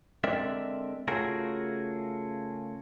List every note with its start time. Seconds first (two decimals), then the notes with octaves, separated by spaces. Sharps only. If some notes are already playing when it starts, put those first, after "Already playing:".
0.24 D3 G#3 C4 A#4 D5 E5
1.08 C#3 A3 F4 F#4 G#4 A#4